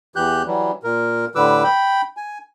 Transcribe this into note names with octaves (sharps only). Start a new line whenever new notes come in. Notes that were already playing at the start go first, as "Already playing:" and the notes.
E2 E3 G4 F#6 G6
E3 F#3 G3
A#2 A#4
A2 D3 G3 B4 D6 E6
G5 B5
G#5